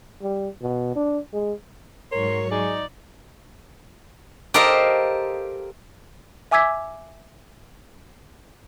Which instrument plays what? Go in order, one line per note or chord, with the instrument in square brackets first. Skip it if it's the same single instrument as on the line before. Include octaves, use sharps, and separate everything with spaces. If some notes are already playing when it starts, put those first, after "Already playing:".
[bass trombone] G3
B2
D4
G#3
[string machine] G#2 F#3 C#6 [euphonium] A#4 [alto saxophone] C#5 [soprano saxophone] C6
[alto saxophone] D#4 [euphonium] G#4 [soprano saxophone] D5
[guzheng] G4 A4 A#4 C5 D#5 F5
[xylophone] E5 G#5 D6 E6 G#6 B6